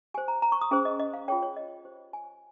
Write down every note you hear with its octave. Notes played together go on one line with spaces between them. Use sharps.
G4 C5 G#5
A#5
A#5
C#6
D#6
C#4 G#4 C5
D#5
D#5
F5
F4 G#4 C#5 G5
C#5
D#5
G4 C5
G#5